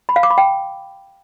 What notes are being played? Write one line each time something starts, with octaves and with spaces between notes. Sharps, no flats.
B5
F5
D6
B5
G5